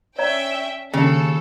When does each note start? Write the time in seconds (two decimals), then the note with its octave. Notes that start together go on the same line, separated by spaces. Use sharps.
0.19 C#4 C#5 D5 E5 G5 A#5
0.94 D#2 C#3 A4